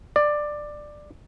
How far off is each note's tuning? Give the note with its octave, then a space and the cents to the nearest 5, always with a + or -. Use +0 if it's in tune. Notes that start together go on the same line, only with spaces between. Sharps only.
D5 +15